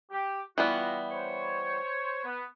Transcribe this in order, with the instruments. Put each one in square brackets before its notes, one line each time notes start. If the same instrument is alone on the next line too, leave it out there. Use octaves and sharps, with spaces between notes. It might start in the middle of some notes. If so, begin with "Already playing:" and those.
[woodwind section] G4
[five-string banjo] E3 G3 B3 [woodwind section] F4 F#4
[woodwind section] C5 C#5
B3